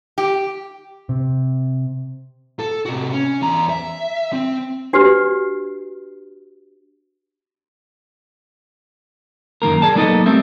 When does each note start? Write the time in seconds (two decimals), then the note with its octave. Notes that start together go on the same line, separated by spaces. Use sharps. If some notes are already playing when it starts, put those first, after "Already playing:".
0.18 G4
1.09 C3
2.59 A4
2.85 C3 F#4
3.13 C#4
3.42 E2 A#5
3.70 E5
4.33 C4
4.93 D4 F#4 G4 B4
9.62 F#2 D#3 A#3 A#4
9.82 G#4 D5 A5
9.95 F#3 A#3 B3 D#4 A4 D#5
10.26 G3 A3 A#3 C4 E5